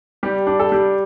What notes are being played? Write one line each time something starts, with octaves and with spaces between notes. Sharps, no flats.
G3 G4
D4
A4
G3